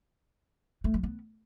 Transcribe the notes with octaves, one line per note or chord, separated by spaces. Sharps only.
A3
F#3
B3